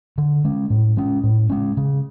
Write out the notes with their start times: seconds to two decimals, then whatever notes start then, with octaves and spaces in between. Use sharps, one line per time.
0.18 D3
0.44 G#3 C#4
0.70 A2
0.97 G#3 C#4
1.23 A2
1.50 G#3 C#4
1.77 C#3